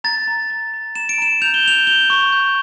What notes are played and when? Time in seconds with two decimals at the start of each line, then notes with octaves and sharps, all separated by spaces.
0.04 A#5 A6
0.27 A#5
0.50 A#5
0.74 A#5
0.95 A#5 E7
1.09 D7
1.18 A#5 E7
1.42 G6 F7
1.54 G7
1.64 G6 F7
1.87 G6 G7
2.10 C#6
2.32 G6